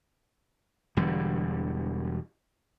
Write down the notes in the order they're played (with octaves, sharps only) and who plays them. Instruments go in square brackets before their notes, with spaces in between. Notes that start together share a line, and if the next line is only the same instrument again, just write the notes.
[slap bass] E1 E2 D3 G3